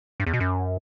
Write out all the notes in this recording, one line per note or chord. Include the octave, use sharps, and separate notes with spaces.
G2
E2
B2
F#2